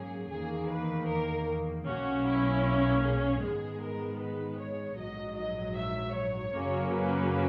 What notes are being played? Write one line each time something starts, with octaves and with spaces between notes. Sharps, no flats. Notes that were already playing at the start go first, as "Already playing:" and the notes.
Already playing: G#2 F#3 A#3 C#4 G#4
E2 D#3 A#3 G#4
B4
A#4
B1 B2 A#3 C#4 F#4
E4
G#4
G#2 D#3 G#3 B3
A#4
B4
C#5
A#1 G#2 F#3 D#5
D#5
E5
C#5
F#2 C#3 F#3 A#3 C#4
B4